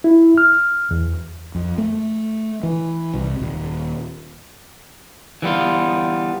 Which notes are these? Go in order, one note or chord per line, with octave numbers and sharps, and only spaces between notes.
E4
F6
E2
F2
A3
E3
C2
D#1
E3 G3 B3 F4